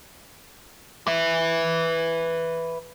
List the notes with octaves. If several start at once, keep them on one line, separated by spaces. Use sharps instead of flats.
B4 E5